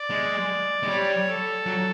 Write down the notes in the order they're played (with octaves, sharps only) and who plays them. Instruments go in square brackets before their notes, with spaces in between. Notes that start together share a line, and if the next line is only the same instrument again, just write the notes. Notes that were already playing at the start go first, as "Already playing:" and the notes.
Already playing: [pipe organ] D5
[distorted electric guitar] G#3
G#3
[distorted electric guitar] G3 [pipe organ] C#5
[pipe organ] A4
[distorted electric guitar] F#3